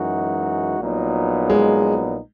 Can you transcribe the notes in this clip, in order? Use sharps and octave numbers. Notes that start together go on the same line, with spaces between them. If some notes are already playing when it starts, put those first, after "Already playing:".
Already playing: F#2 E3 G#3 D#4 F#4
A#1 A#2 F#3 B3 D#4
G#3